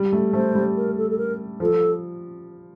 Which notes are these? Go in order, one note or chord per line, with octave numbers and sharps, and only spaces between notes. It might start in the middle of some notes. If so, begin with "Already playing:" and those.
Already playing: G3
A3
A3 C5
G3
A#4
A4
A4
A#4
F3 A4